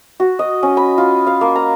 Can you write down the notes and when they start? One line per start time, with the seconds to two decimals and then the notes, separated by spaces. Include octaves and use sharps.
0.20 F#4
0.39 D#5
0.63 C#4
0.77 B5
0.98 F4
1.27 F5
1.41 A#3
1.55 A#5